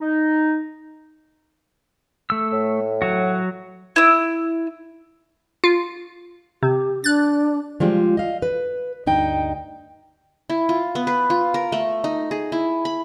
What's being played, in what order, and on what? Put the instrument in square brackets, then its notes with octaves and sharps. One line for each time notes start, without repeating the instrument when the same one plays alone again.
[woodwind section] D#4
[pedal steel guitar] A3 E6
[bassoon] A2
[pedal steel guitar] F#3 F#4
[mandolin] E4 E6
[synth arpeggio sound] F4
[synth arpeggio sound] C3 [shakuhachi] G4
[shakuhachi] D4 [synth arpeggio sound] F#6 A6
[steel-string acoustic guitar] F3 G3 G#3 F4
D#5 F5
B4
D2 G2 D#4 G5
[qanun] E4
F4
B3
B4
F4
A#4
A3
D#4
G#4
E4
B5